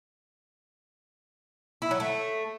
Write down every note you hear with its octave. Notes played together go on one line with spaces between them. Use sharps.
E4
F#3
A3